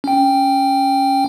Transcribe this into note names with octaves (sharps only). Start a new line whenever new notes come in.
C#4 G5